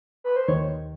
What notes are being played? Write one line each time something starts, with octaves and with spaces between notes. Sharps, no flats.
B4
C5
D#2 D#3 C#5